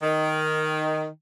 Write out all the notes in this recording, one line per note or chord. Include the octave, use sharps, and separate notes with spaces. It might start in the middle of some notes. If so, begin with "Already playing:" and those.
D#3